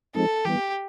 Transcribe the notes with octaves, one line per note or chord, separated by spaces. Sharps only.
F3 G#3 C4 D#4 A4
E3 G3 B3 G4